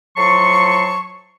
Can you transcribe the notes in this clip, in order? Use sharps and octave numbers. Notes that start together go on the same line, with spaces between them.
A2 F3 F#3 A5 C6 C#6